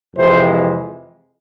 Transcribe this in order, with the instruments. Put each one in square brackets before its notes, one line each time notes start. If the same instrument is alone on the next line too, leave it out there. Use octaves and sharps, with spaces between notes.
[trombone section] F2 C3 E3 G#3 C5